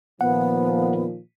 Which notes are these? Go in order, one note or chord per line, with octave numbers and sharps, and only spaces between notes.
A#2 D#3 F3 B3 F#5